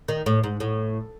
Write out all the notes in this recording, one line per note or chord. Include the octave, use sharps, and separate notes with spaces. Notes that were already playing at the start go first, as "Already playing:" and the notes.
D#3
A2
G#2
A2